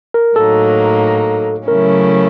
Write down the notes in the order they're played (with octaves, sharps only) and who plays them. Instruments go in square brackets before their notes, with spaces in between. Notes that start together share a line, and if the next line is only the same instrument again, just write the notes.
[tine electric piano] A#4
[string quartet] A2 F#3 A#3 D#4 [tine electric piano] A4
[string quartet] C#3 F#3 A3 C#4 E4 [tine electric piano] A#4